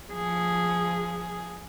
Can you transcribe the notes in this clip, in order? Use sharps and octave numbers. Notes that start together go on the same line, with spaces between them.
F3 G#4